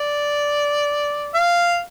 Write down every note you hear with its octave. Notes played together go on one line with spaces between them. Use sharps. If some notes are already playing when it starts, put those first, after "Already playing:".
Already playing: D5
F5